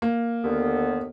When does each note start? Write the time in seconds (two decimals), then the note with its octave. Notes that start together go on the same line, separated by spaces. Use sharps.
0.02 A#3
0.44 D#2 D3 B3